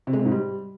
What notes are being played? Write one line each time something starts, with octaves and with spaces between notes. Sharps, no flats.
C3
G#3
C3
G#2
G3